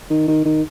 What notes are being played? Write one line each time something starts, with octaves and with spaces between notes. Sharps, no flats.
D#3
D#3
D#3